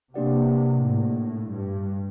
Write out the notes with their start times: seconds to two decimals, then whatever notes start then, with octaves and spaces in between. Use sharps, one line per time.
0.14 C3 A#3 D4 G4 D5 F#5
0.82 A2
1.51 G2